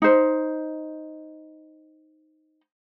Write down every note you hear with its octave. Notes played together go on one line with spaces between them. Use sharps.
D#4 C5